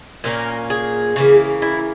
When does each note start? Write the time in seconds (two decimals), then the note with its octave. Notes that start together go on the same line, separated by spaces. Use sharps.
0.24 A#2 A#3 C#4 A#4
0.70 G#4
1.16 C#3 E3 A#3
1.62 E4